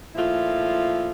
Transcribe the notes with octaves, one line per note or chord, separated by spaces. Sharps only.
A#2 F3 A3 E4 F4